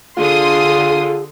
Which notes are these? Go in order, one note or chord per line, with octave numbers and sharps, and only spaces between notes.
D3 F4 G#4 C6 D#6